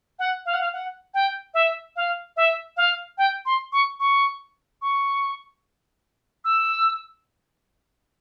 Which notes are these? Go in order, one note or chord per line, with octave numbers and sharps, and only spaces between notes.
F#5
F5
F#5
F5
F#5
G5
E5
F5
E5
F5
G5
C6
C#6
C#6
C#6
E6